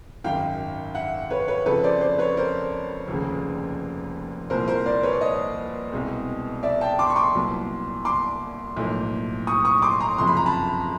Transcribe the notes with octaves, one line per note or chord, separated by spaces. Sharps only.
G#1 F#2 D#3 F5 G5
E5 F#5
B4 C#5
B4 C#5
F2 C#3 F3 A4 B4
C5 D5
C5 D5
B4 C#5
A#4 C5
F1 D#2 C#3
C2 A#2 F3 A#4 C5
A#4 C5
C5 D5
B4 C#5
D5
C#5 D#5
C2 B2 G#3 C4
D5 E5
G5 A5
C6 D6
C#6
C6 D6
C2 A#2 F#3 B3
C6 D6
B1 A2 F3 A#3
C#6 D#6
C#6 D#6
C6 D6
A#5 C6
F#1 F2 C3 F3 C6
B5
A#5
A5 B5